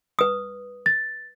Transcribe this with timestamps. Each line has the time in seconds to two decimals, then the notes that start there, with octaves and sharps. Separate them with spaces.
0.19 B4 D#6
0.86 A6